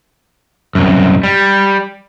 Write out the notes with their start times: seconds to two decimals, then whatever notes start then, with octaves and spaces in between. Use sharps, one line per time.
0.75 C2 F#2
1.23 G3